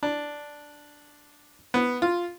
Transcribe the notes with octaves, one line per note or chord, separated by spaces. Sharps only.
D4
B3
F4